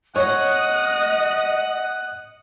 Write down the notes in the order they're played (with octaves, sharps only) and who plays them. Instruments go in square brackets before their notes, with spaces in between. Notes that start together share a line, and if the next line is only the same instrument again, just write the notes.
[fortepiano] C#5 [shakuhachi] D#5 [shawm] F#5 [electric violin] D#6 F#6